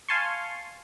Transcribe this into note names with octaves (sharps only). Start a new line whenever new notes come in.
F5 G#5 A5 C6 C#6